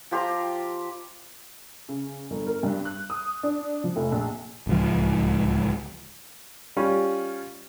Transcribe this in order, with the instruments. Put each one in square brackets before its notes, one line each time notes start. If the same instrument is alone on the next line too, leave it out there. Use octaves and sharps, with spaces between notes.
[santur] F3 G4 C5 A#5
[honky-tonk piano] C#3
G1
A#4
G2
F#6
D#6
D4
F3
F1
A#1
[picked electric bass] D1 C#2 F3
[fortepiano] G3 C#4 F4